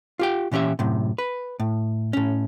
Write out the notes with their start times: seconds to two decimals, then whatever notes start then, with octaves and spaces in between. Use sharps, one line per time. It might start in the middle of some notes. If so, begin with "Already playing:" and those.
0.19 F4 G4 G5
0.52 A#2 E3 C#4 G4 E5
0.79 F#2 A2 C3
1.18 B4
1.60 A2
2.13 A2 C#4